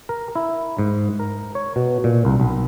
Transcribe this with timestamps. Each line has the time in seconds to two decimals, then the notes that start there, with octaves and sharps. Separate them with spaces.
0.09 A#4
0.36 E4
0.79 G#2
1.20 A#4
1.55 C#5
1.76 B2
2.04 A#2
2.25 C2
2.40 B1